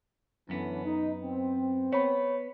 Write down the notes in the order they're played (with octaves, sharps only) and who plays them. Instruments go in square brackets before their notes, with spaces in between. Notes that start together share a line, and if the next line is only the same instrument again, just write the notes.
[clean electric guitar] F#2 B3 [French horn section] D3 E3 C#4
[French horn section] D#4
C4
[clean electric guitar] B3 [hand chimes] C#5 B5